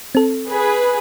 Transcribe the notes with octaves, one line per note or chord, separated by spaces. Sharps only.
C4 A4
G#4 B4